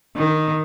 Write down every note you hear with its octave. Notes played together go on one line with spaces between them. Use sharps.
D#3